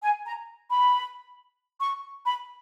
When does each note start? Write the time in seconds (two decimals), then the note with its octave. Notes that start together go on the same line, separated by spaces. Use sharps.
0.03 G#5
0.25 A#5
0.70 B5
1.81 C#6
2.27 B5